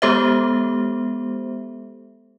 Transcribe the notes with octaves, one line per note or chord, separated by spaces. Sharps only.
G#3 B3 G4 A4 C5 E5